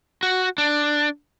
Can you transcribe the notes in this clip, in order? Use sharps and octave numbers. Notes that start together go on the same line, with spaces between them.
F#4
D4